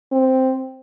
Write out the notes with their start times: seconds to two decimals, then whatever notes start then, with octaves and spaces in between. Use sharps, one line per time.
0.12 C4